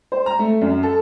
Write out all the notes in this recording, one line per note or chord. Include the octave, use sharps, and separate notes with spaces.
C5
A#5
A3
F#2
A4